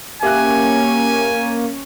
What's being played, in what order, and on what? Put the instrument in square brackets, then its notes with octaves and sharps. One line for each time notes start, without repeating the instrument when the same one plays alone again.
[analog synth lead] A#3 [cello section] C#4 [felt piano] G4 E5 F#6 [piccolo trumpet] G#5